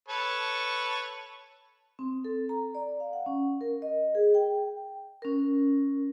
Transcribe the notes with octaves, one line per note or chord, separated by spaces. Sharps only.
A4 B4 C#5
C4
A4
A#5
D5
F5
F#5
C#4
A#4
D#5
G#4
G5
C#4 A#4